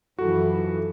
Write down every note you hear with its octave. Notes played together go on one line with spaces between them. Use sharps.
F#2 E3 F3 F#4 A4